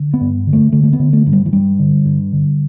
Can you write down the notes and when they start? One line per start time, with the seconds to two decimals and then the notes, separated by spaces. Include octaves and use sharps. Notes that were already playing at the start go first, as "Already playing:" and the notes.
Already playing: D3
0.14 B3
0.21 G2
0.47 D3
0.53 A3
0.72 D3 A3
0.83 A3
0.93 B3
1.00 D3
1.13 A3
1.27 G2
1.33 G3
1.46 E3
1.53 G2 G3
1.79 D3
2.05 G2
2.32 D3